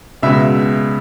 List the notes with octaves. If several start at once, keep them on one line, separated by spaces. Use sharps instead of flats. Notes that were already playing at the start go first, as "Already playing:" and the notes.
C#2 B2 G#3 E5